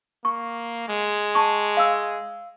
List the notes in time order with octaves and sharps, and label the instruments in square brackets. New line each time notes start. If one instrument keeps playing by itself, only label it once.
[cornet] A#3 [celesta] C#6
[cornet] G#3
[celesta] A5 C#6
F5 E6